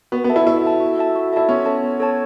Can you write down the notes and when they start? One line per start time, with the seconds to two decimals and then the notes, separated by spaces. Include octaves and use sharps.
0.12 B3 F#4
0.24 B3
0.30 A4 E5 A5
0.36 E4
0.47 E4 F#4
0.64 A4 E5 A5
0.80 F#4
0.98 A4 E5 A5
1.16 F#4
1.33 E4 A4 E5 A5
1.49 B3 C#4
1.66 A4 C#5 A5
1.83 B3
2.00 A4 C#5 A5